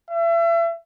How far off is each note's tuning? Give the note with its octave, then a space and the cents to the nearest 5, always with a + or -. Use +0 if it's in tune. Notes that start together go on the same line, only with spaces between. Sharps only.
E5 +35